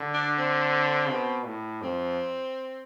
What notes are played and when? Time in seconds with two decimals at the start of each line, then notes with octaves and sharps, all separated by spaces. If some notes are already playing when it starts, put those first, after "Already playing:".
Already playing: D3
0.14 D4
0.38 C4
1.10 B2
1.46 A2
1.82 F2 C4